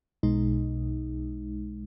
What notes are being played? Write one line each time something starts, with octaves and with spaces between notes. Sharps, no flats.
B1 B2 G#3 D#4